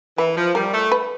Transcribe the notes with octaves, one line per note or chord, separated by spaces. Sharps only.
E3 B4
F3
G3 A#4
A3
B4